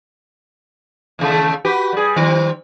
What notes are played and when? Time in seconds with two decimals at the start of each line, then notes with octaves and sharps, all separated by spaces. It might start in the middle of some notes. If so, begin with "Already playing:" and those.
1.19 D#2 C#3 A3
1.65 F#4 G4 B4
1.93 G3 G#4
2.16 D#3 G3 C4